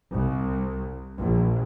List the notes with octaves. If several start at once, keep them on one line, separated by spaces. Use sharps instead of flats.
C2
A#1